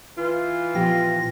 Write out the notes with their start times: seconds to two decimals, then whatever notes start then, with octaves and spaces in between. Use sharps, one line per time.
0.18 E3 F4
0.75 A#2 F3 B3 G4 A#6